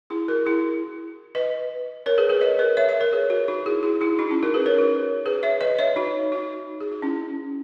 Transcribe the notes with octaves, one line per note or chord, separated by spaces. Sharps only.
E4 G#4
F#4 A#4
E4 G#4
B4 D#5
A#4 C#5
G#4 B4
G#4 B4
B4 D#5
A#4 C#5
C#5 E5
C#5 E5
A#4 C#5
G#4 B4
F#4 A#4
D#4 F#4
E4 G#4
E4 G#4
E4 G#4
D#4 F#4
C#4 E4
F#4 A#4
G#4 B4
A#4 C#5
F#4 A#4
G#4 B4
C#5 E5
B4 D#5
C#5 E5
D#4 F#4
D#4 F#4
G#4
F#4
C#4 E4